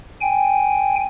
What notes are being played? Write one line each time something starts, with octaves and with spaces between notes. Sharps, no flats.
G5 G#5